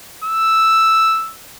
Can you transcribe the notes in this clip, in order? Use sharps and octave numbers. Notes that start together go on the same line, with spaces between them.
E6